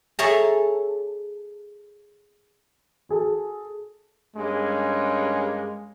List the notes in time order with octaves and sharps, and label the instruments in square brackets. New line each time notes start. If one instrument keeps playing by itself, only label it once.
[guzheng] G#4 A4 C#5 E5 A5 A#5
[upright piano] F#4 G#4 A4
[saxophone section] G2 A#3 C#4 [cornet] G#3